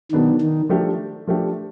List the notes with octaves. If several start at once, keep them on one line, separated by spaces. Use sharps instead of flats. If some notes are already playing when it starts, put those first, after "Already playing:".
B2 D#3 F#3 B3 D4
D#3
F3 A3 D4 G4
F3 A3 D4 G4